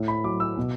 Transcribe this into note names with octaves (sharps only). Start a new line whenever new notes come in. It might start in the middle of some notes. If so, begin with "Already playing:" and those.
Already playing: A2
B5
F#3 D6
E6
B2